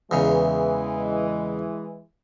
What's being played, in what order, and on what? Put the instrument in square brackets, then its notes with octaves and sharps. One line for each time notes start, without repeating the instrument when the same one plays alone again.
[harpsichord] E2 C#3 [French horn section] E3 G#3